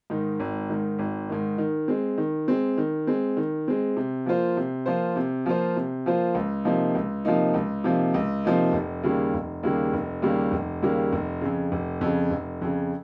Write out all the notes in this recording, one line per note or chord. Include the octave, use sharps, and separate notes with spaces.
G#2 D#3
G#1
G#2 D#3
G#1
G#2 D#3
D#3
G#3 C4
D#3
G#3 C4
D#3
G#3 C4
D#3
G#3 C4
C3
F3 A#3 F4 C5
C3
F3 A#3 F4 C5
C3
F3 A#3 F4 C5
C3
F3 A#3 F4 C5
C#2
C3 F3 A#3 D#4
C#2
C3 F3 A#3 D#4
C#2
C3 F3 A#3 D#4
C#2
C3 F3 A#3 D#4
F1
D#2 C#3 G3 A#3
F1
D#2 C#3 G3 A#3
F1
D#2 C#3 G3 A#3
F1
D#2 C#3 G3 A#3
F1
F2 C#3
F1
F2 C#3
F1
F2 C#3